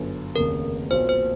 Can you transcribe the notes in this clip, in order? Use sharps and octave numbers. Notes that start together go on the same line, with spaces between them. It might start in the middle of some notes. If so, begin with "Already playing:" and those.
Already playing: G1 F#2 D3
F1 D#2 C#3 A#4
B1 A#2 F#3 A#3 C5
C5